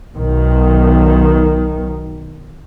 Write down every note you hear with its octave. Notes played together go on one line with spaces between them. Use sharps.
B1 D#3